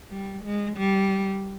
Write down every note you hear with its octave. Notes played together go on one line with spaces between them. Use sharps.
G3
G#3
G3